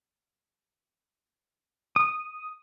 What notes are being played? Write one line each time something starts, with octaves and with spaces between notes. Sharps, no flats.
D#6